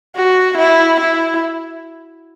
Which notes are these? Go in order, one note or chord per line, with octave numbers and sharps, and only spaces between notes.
F#4
E4
E4